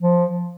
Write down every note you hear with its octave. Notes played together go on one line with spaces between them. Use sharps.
F3